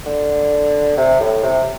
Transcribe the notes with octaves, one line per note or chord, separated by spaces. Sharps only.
D3
C3
A2
C3